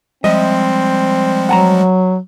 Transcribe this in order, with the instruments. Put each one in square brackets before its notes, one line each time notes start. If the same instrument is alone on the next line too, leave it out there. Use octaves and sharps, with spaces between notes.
[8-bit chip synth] F3 G3 G#3 [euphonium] C4 [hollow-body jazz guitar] D#5 E5
[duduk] F#3 [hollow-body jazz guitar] F#5 A5 A#5